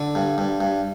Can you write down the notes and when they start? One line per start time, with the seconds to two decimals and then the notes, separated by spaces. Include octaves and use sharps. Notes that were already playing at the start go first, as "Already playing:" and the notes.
Already playing: D3
0.15 G2
0.38 G2
0.61 G2